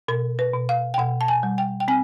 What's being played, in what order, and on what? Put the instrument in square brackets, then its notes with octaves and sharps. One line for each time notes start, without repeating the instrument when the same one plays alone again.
[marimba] B2 A#4
B4
B2
F5
G5
B2 F#5
A5
G#5
G3
G5
G5
C4 G#5